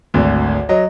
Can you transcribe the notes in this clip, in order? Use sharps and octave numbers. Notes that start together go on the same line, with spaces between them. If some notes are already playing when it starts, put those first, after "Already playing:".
G#1 D2
F#3 D#5